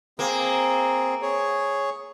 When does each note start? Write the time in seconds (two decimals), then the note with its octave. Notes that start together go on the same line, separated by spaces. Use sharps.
0.19 A#3 C4 G#4
1.22 G#4 C#5